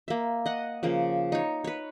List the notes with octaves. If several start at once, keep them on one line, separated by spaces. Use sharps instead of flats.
A#3 E5
D#5 F#5
C#3 F3 A#3
D#4 C#5
B4 C#5